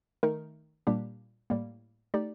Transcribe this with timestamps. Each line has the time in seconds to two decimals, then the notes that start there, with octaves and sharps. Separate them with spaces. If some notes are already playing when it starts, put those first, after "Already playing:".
0.23 D#3 A3 D#4 A#4
0.87 A#2 G3 A#3 D4 G4
1.50 A2 G3 A#3
2.14 A3 D#4 G4 D5